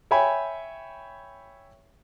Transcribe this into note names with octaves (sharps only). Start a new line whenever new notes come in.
C#5 E5 G5 G#5 B5